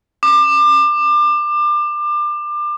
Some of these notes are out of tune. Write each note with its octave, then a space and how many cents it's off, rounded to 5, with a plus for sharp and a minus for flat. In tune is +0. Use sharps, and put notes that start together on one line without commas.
D6 +30